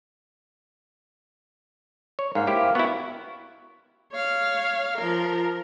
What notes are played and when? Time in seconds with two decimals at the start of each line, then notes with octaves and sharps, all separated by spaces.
2.19 C#5
2.35 G#2 A#3
2.47 E4 G4 C5
2.75 B3 E4 F#4
4.12 C#5 F5
4.98 F3 A#4